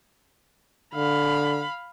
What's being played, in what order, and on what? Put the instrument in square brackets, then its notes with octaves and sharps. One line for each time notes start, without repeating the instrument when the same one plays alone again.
[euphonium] D3 [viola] F5 B5